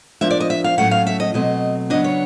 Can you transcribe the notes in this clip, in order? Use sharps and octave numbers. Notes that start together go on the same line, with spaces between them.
F3 A#3 D4 E5
D5
D#5
E5
F5
A2 F#3 A3 C#4 F#5
F5
E5
D#5
B2 F#3 A3 C4 D#5
C#3 F#3 B3 D4 D#5
C#5